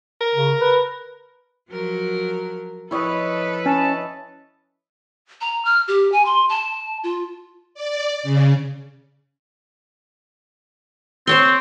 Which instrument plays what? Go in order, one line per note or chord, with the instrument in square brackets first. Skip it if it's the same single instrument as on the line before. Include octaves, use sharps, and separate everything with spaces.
[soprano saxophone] A#4
[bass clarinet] C#3
B4
[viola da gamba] F3 F#3 A#4
[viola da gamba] F3 A4 B4 [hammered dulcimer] E4 C#5 D#5
[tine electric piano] C#4 [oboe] A5
[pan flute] A#5
F6
G4
G#5
C6
A5
F4
[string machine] D5
C#3
[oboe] C4 [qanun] C5 C#5 C6